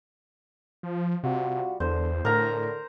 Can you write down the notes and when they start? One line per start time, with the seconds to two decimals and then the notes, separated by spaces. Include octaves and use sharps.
0.83 F3
1.23 C3 G3 F4 F#4
1.80 E2 D3 C5
2.25 A2 D3 A#4 A#5